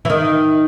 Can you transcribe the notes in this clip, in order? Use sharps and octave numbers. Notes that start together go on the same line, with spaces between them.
E3
D#3